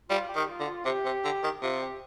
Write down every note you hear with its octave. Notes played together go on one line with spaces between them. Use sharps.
G3 F4
G4
D#3
F4
D3
F4
C3 G4
C3
D3
D#3
C3 F4
G4